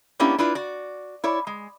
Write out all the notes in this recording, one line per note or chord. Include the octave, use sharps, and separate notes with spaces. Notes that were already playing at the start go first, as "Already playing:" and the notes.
A#3 B3 C#4 D4 E4 G4
D4 E4 F4 B4 D5
F#4 D5
E4 C#5 D5
G#3